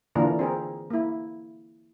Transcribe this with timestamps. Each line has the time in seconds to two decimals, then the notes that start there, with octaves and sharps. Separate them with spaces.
0.15 D3 E3 A#3 D4 F4 A#4
0.39 C4 G#4 A#4
0.90 A#3 E4